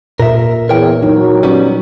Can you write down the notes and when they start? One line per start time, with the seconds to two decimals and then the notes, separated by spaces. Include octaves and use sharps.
0.20 A#2 A#4 E5
0.69 E2 A#4 C#5 G5
1.03 F#3 D#4
1.43 G3 B3 C#4